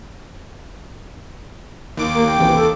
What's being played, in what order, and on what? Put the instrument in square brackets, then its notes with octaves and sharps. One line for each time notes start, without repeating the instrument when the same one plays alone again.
[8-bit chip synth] D#2 D6
[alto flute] A#3
G5
[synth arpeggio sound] A1 C3 E3
[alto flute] A4